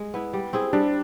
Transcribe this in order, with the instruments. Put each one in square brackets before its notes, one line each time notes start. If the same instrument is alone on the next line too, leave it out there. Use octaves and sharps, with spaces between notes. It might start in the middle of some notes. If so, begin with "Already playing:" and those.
Already playing: [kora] G#3
B3 E4
G3
C4 E4 G#4
[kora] G3 [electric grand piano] D4